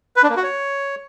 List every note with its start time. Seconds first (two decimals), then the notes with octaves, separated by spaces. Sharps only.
0.16 B4
0.23 D4
0.30 A#3
0.37 F#4
0.43 C#5